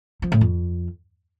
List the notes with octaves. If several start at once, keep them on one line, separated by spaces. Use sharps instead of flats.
F3
A2
F2